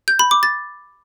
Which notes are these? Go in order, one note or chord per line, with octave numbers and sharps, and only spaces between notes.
G6
B5
D6
A6